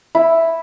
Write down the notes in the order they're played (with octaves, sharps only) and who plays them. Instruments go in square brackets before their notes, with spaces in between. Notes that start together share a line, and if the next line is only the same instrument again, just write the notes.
[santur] E4